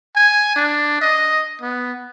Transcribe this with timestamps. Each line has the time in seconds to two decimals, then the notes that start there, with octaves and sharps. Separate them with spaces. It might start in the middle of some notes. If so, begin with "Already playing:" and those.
0.16 G#5
0.56 D4
1.01 D#5
1.62 B3